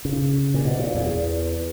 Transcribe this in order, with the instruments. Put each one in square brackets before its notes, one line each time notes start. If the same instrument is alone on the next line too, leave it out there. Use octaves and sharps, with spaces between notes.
[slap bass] C#3
A#2
B2
A#2
E2